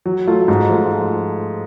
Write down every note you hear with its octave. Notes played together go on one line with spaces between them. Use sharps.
F#3
A3 F4
G#2
F3 A3 F4